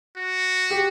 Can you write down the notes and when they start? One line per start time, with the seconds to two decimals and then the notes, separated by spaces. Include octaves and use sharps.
0.16 F#4
0.71 G4